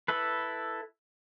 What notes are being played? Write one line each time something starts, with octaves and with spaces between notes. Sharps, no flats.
E4 A4 B4